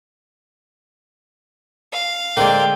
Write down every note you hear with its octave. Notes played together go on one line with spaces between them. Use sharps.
F5
D3 G#3 A#3 C4 D5 G5